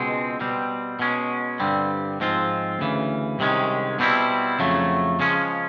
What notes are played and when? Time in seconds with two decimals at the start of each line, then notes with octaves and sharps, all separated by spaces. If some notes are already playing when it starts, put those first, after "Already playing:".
Already playing: C#2 B2 G#3 C4
0.40 B2 G3 C4
0.99 B2 G#3 C#4
1.60 G2 D3 G3 C4
2.20 G#2 F3 G#3 C4 F4
2.79 D2 C#3 E3
3.39 C2 C3 D#3 G#3 C#4
3.99 B2 G3 C4 E4
4.59 F2 C#3 F#3 A3
5.20 C#3 F3 G#3 C#4